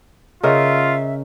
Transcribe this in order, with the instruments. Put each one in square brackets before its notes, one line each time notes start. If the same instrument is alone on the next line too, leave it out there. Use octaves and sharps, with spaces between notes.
[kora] C#3 A#4 D#5 [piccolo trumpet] F4 [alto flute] E5